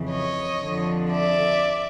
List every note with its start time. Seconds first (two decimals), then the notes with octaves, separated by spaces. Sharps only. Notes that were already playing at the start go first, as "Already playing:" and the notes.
Already playing: F2 C#3 E3
0.11 C#5 D#5
0.62 F2 D3 F3
1.12 D5 E5